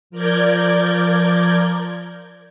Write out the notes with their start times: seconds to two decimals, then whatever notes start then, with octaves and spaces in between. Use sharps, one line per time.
0.10 F3 A#4 D5 G6 G#6